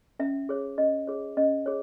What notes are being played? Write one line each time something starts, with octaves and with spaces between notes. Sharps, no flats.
C#4 E5
G#4 C#5
C#4 D#5
G#4 C#5
C#4 D#5
G#4 C#5